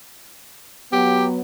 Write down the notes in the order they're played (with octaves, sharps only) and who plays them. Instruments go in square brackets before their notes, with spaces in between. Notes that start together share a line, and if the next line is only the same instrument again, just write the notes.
[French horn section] F#3 B3 [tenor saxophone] G4